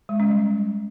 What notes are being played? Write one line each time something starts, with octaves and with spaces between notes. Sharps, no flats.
G#3
C#4
G3